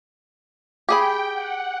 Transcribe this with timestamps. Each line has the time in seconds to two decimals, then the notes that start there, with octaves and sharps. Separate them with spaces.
0.89 G4 G#4 G5 B5
1.33 F#5